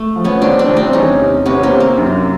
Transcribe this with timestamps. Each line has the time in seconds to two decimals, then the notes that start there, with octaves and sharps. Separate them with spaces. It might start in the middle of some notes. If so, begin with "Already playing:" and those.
Already playing: A3
0.16 F3
0.24 B3 C#4
0.42 C2 C4 D4
0.59 C4 D4
0.68 C2
0.77 C4 D4
0.93 E2 C#4 D#4
1.20 C3
1.46 C3 B3 C#4
1.63 A#3 C4
1.72 C3
1.80 A#3
1.98 F#2